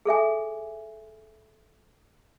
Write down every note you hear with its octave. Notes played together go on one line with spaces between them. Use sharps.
G#4 A4 E5 G#5